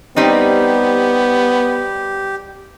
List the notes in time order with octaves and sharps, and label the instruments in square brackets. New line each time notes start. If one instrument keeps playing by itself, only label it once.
[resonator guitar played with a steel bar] G3 C4 D#4 [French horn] B3 [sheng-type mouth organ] G4